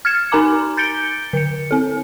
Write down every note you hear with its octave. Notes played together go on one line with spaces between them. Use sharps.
F6 G#6 A6 C#7 E7
D#4 A#4 G#5 A#5 D6
G6 A6 C#7 D7 G7
D3 C#7
C4 A4